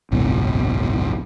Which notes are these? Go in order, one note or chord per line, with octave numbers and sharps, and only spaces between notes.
G#1 C#2 F#2 B2